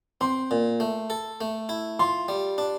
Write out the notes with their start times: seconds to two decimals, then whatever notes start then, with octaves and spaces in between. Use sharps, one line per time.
0.21 C4 C6
0.51 A#2
0.80 A3
1.10 A4
1.41 A3
1.69 E4
1.99 F4 C6
2.28 G3
2.58 D4